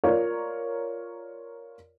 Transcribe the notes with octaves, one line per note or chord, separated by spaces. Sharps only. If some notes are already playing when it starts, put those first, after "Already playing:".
F4 A#4 C#5 D5 F5